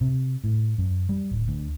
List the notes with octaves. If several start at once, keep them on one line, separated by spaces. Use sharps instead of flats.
C3
A2
F#2
G3
D1
D2